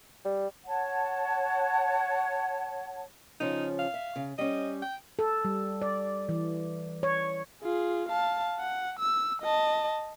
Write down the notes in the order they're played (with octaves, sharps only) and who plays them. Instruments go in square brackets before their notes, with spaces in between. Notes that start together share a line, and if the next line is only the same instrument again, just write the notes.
[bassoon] G3
[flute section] C#5 F#5 A5
[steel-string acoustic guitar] C#3 F3 C#4 [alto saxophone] D#4
[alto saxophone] F5
[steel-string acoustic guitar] E5
C#3
[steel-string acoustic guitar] G3 C#4 [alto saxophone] D#5
[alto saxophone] G5
[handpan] A4
G3
D5
E3
C#5
[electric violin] F4 G#4
F5 A5
F#5
E6
D#5 A5